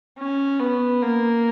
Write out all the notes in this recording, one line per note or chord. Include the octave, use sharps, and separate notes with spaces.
C#4
B3
A#3